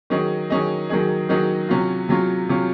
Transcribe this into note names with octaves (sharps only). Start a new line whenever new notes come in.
D#3 F#3 C#4 G#4 D#5
D#3 F#3 C#4 G#4 D#5
D#3 F#3 C#4 G#4 D#5
D#3 F#3 C#4 G#4 D#5
C3 F#3 C#4 F4
C3 F#3 C#4 F4
C3 F#3 C#4 F4